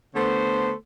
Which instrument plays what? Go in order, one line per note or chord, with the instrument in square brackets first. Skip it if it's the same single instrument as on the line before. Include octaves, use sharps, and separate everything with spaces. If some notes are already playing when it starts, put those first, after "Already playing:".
[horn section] D3 A3 B3 C5